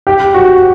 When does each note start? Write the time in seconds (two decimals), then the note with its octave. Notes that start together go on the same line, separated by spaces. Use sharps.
0.07 G4
0.34 F#4